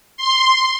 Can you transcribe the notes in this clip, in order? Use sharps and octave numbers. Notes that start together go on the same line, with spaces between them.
C6